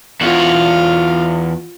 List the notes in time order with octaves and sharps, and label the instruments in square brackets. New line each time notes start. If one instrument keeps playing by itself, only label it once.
[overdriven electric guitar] E2 F#4 [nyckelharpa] F4 F5